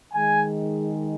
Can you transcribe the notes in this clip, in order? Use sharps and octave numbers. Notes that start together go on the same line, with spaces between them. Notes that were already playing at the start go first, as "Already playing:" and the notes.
D#3 G#3 G#5